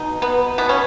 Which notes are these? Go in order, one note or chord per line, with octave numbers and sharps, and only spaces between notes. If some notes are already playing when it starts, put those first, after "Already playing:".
Already playing: B2 D#4
B3
B2 B3
C#4